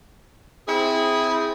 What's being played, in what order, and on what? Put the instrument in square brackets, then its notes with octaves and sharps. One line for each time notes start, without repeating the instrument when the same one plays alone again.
[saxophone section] C4 E4 G#4